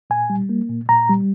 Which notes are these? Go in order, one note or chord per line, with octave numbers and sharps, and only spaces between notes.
A#2 G#5
G3
A#3
A#2
A#2 A#5
G3